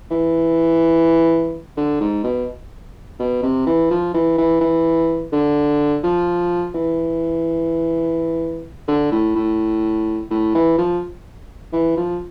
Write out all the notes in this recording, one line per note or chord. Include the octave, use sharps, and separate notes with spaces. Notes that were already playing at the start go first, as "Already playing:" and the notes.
E3
D3
G#2
B2
B2
C3
E3
F3
E3
E3
E3
D3
F3
E3
D3
A2
A2
A2
E3
F3
E3
F3